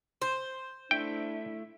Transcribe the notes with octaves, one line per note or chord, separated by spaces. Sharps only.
C5
A3 D4 E4 G5